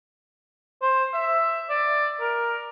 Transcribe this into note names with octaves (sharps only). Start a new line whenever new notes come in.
C5
E5
D5
A#4